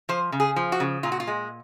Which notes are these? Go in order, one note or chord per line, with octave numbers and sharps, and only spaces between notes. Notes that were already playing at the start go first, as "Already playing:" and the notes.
F3 C5
C#3
G#4
F3
F#4
C#3
A#2 F4
F#4
F4
G#3